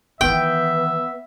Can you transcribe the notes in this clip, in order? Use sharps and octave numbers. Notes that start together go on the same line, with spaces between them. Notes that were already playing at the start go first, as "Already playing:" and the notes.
D#3 E3 B3 E5 G5